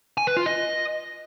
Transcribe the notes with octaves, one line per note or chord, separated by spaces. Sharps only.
G#5
B4
F4
D#5